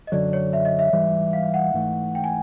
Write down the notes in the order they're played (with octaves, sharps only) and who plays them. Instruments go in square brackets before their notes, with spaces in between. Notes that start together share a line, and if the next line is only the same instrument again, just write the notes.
[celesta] D#5
[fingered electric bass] F#2 D3 F#3 [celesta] D5
[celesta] C#5
E5
D#5
E5
[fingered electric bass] G#2 E3 G3
[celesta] F5
F#5
[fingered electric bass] G#2 E3 A3
[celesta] G5
G#5